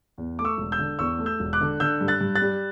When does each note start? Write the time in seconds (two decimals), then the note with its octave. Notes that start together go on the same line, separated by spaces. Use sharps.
0.18 E2
0.39 A3 D6
0.45 C#6 E6
0.58 E1
0.72 E6 G6
0.79 D3
0.99 E2 C#6 E6
1.19 A3
1.26 E6 G6
1.40 E1
1.53 D6 F#6
1.61 D3
1.80 D3 E6 G6
2.01 G2
2.08 F#6 A6
2.21 G2
2.35 F#6 A6
2.42 G3